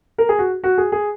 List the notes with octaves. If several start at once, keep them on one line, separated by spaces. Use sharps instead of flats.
A#4
G#4
F#4
F#4
G#4
G#4